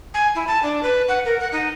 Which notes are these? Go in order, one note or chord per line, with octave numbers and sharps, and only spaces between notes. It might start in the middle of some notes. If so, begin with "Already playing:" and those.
G#5
E4
A5
D4
B4
F#5
A#4
F#5
D#4